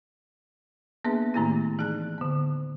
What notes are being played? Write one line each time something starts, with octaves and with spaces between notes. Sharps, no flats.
A#3 B3 D4 G#4 B4 E5
A2 D#3 A3 A#3 C4 E4
E3 D#4 G#4 A5 F#6
D3 B3